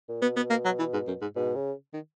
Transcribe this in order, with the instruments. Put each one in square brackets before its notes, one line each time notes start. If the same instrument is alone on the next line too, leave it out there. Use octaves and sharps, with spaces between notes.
[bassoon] A#2
[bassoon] B2 [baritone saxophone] B3
[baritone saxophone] B3
A#3
F#3
E3
G#2
F#2
G#2
[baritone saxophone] G#2 [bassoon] B2
[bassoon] C#3
[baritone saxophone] D#3